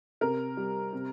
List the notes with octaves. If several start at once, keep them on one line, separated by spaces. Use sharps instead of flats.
C3 A#4
G3
C3